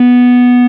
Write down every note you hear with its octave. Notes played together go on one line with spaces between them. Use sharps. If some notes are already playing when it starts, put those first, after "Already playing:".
Already playing: B3